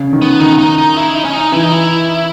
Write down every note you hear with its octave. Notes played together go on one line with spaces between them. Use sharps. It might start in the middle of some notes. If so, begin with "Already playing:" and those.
Already playing: C#3
D#3
B3
D#3 D#4
D#4
D#4
E4
D#4
C#4
D#4
E3 E4
D#4
E4